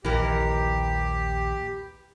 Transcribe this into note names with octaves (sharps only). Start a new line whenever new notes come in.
A#1 D#2 E3 G4 A#4